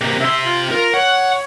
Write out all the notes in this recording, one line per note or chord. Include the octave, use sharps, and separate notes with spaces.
C3 A#3
C3 E5 C6
F4
F4 A#4
C#5 F#5